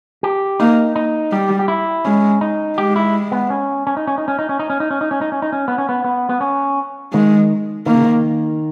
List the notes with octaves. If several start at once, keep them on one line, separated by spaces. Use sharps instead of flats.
G4
A#3 D#4
D#4
G3 G4
G4
E4
G#3 C#4
D#4
G#3 G4
E4
B3
C#4
C#4
D#4
C#4
D#4
C#4
D#4
C#4
D#4
C#4
D#4
C#4
D#4
C#4
D#4
C#4
D#4
C#4
B3
C#4
B3
B3
B3
C#4
D#3 G#3
D#3 A#3
C#3
D#3